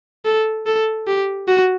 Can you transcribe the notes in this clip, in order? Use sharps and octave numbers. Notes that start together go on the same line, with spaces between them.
A4
A4
G4
F#4